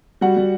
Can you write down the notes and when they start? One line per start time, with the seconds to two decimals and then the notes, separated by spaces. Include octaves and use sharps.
0.21 G3 F#4 F#5
0.36 G3